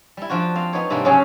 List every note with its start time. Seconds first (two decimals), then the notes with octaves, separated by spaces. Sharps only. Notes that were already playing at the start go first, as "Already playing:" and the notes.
0.17 G3 E4
0.29 F3 D4 F4 F#4
0.55 C4 F5
0.73 B3 D#4 C#5
0.90 G#2 C3 G3 A#3 D4
1.05 C#3 F#3 C#4 G#4 C#5 A5